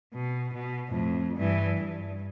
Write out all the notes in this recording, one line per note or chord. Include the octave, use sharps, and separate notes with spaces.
B2
B2
F2 A2
G2 E3
G2